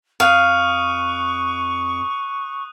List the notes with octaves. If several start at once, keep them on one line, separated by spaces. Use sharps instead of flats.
F2 F5 C#6 D#6 F#6 D#7